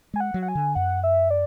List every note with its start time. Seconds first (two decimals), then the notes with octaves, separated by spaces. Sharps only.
0.14 G#3 G#5
0.20 F#5
0.34 F#3
0.42 F#5
0.48 G#5
0.55 D3
0.75 F#2 F#5
1.04 E5
1.30 D5